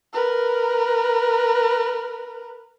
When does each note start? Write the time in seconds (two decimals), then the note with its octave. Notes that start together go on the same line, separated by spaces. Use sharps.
0.13 A#4 B4